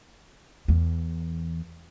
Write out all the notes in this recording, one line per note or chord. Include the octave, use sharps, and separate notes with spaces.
E2